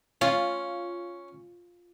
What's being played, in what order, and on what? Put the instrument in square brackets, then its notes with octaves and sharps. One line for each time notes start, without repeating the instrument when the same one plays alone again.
[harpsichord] C#4 [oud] F4